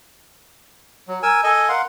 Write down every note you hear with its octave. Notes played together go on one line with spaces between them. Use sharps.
F#3
A#4 G#5 E6
A4 D#5 G#5
A#4 F5 F#5 C6